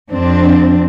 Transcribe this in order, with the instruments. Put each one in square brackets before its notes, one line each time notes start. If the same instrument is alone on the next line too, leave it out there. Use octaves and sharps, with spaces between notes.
[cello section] F2 C4 D4